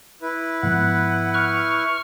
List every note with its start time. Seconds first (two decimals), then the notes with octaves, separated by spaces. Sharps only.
0.22 E4 B4
0.63 G#2 F3 B3 F#5
1.34 C#6 F6